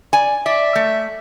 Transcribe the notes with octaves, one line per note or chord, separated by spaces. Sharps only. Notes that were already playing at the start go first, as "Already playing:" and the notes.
D5 G#5
D5 E5
A3